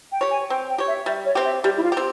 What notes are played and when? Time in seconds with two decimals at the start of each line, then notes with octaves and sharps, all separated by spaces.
0.12 G5
0.21 G4 C#5
0.31 G#5
0.50 C4 G5
0.69 G5
0.78 G4 C#5
0.88 E5
1.06 G3 E5
1.26 C#5
1.35 C4 G4
1.45 E5
1.64 G3 G4
1.78 E4
1.83 F4
1.92 C4 G4